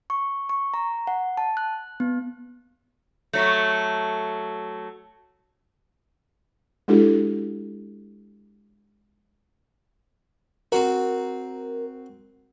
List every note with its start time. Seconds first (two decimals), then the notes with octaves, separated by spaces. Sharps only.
0.10 C#6
0.49 C#6
0.74 A#5
1.07 F#5
1.37 A5
1.57 F#6
2.00 B3
3.33 F#3 A3
6.88 G#3 D4 E4 F#4 G4 A4
10.72 C4 F#4 A#4